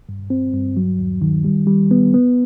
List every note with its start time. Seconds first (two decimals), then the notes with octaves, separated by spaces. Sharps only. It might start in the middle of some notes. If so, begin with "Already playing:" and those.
0.09 G2
0.30 C4
0.54 G2
0.77 F#3
0.99 D#2
1.22 D#3
1.44 G3
1.67 G3
1.91 B3
2.14 B3